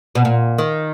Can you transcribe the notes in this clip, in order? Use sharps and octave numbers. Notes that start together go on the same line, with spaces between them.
B2
A#2
D#3